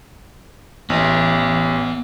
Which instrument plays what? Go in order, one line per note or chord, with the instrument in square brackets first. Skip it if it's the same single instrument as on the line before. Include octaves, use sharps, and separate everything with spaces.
[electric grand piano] A1 [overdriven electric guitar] B3 E5